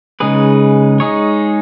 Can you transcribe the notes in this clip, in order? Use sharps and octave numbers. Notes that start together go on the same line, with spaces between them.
C#3 G#3 D#4 G#4 B4
G#3 D#4 G#4 C#5